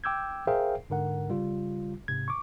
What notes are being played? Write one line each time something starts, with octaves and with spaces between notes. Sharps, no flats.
G5 D6 E6 G6 G#6
G#4 A#4 C5 E5 F5 G5
G#2 D3 A#4 F#5
C#3 G3 F4
G#2 C3 G#6
C#6 D6